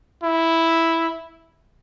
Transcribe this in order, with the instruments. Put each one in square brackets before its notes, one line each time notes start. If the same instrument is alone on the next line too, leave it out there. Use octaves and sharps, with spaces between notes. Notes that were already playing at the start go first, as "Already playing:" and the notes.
[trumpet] E4